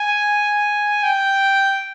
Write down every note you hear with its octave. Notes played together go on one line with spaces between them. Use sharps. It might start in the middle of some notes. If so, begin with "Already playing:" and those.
Already playing: G#5
G5